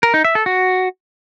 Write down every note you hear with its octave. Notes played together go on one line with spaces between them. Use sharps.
A#4
D#4
E5
A4
F#4